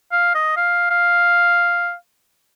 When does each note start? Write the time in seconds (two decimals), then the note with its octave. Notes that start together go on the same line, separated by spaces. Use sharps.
0.12 F5
0.35 D#5
0.57 F5
0.90 F5